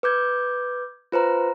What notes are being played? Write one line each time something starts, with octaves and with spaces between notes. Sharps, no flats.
B4 D6 G6 G#6
F4 B4 C5 A#5